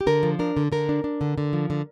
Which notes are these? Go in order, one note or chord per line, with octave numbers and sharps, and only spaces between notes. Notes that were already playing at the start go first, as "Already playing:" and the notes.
G4
D3 A#4
F3
D4 A#4
D3
D3 A#4
D4
D4
D3
D3
F3
D3